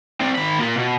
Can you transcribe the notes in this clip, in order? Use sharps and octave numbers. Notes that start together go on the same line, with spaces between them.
C4 D5
D#3 B5
A#3 F4
B2